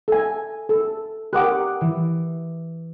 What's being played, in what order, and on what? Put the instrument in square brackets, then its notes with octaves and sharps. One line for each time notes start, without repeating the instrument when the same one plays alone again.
[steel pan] A4 G#5
A4
[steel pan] G4 A#4 F#5 [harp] D6 D#6 F#6
[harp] E3